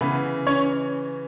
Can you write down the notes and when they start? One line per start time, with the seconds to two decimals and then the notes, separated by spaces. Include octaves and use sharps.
0.01 C#3 E3 B3 B4
0.47 C#4 C#5